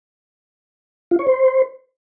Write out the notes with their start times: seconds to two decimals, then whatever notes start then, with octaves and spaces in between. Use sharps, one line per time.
1.11 F4
1.19 C#5
1.27 C5